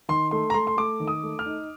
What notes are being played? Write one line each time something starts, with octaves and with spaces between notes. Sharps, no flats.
D#3 C6
A3 C6
A#5
A3 C6
C6
A3 D6
D#3
D#6
A3
F6
D#4